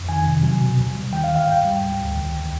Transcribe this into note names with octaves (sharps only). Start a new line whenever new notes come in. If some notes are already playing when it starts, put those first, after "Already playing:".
Already playing: F2
D#3 G#5
C3
F#3
B2
D#2
G3
D#3 G5
F5
D#2
F5
G#2 G5
G3
D2
D2
D#2